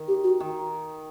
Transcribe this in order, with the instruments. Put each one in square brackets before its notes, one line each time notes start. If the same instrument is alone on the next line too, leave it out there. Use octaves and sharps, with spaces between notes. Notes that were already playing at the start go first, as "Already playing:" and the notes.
Already playing: [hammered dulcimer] D#3
[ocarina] G4
F#4
[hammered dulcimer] D#3